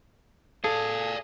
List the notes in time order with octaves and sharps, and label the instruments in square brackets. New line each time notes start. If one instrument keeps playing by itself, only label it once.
[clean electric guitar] G#4 [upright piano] A4 [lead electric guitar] D5 F5